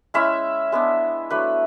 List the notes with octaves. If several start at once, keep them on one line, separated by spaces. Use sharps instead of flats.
G#3 C#4 E4 E5
G#3 B3 D4
F#3 A3 D4 B4